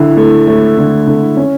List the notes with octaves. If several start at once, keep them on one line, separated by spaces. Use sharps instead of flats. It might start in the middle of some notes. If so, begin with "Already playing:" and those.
Already playing: D3 E4
A3
A3
D3
D3
C#4